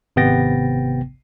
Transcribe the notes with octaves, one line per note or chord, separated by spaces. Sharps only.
G#1 C3 B3 G5 A6 A#6